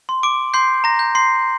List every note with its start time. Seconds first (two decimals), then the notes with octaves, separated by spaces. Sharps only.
0.09 C6
0.23 D6 D7
0.54 C6 G6 C7
0.84 A#5 A#6
0.99 G6
1.15 C6 C7